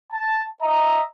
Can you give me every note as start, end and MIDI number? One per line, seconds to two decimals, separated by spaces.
0.12 0.44 81
0.61 1.03 75
0.61 1.03 76
0.61 1.03 82